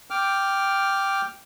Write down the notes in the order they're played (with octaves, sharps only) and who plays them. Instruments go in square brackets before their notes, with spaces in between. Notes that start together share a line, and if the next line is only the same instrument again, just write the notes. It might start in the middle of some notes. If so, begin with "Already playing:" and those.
[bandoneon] G5 D6 F6